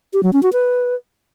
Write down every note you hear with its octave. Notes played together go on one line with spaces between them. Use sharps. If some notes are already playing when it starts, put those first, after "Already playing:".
G4
F#3
C#4
F#4
B4